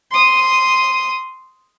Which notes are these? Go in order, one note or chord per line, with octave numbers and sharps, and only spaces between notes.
C6 D#6